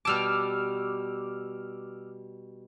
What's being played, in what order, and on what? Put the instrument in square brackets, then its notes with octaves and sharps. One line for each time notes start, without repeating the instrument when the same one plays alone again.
[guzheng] B2 G3 A5 [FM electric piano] D6 E6 F6